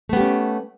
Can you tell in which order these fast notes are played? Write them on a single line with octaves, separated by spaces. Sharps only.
A3 B3 G4 C#4